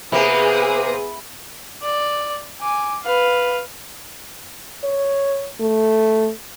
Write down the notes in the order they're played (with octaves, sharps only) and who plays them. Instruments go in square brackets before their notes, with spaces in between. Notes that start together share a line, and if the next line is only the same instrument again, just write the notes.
[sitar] C3 A#3 [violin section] B3 G#4 D#6 [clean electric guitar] E4 [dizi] B4
[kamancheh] D5
G#5 D6
B4 F5
[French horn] C#5
A3